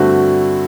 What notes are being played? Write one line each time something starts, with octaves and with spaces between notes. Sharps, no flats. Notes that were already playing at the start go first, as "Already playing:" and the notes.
Already playing: G2 D3 A3 C4 F#4